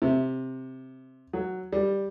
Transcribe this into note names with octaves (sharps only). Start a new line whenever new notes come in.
C3
F#3
G3